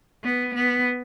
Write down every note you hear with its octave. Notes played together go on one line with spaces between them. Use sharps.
B3
B3